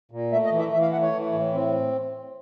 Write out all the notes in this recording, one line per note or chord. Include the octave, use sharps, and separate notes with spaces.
A#2
A3 E5
D#5
E3
E5
E3 E5
F5
A3 F#5
C#5
E3
A2
C4